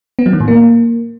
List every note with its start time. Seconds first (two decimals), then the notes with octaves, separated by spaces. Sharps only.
0.19 B3
0.26 F#3
0.33 D#3
0.40 A2
0.48 A#3